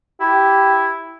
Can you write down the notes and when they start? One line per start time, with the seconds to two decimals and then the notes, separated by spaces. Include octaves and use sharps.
0.21 E4 G4